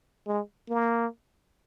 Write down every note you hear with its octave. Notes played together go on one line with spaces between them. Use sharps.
G#3
A#3